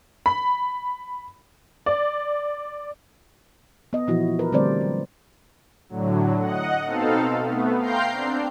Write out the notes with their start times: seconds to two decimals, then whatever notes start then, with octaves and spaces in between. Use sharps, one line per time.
0.26 B5
1.86 D5
3.93 B3 D#5
4.07 A#2 E3 F3 E4 F#4
4.39 A#4 B4
4.52 D3 G3 A3 C4 C5 D5
4.81 F#3
5.89 A2 D3 F#3
6.39 D#5 F#5
6.85 B2 C4 D#4 A4 F5
7.38 A3 B3
7.78 F5 G5 A#5 C6 G6 C7
8.12 C4 D4